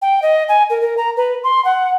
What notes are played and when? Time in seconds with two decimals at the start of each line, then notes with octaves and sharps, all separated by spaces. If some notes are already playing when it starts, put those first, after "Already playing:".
0.01 G5
0.22 D#5
0.48 G#5
0.69 A#4
0.81 A#4
0.97 A#5
1.16 B4
1.43 C6
1.64 F#5